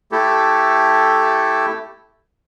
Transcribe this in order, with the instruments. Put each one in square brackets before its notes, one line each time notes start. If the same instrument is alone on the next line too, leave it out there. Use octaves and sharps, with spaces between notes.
[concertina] A3 E4 G4 A4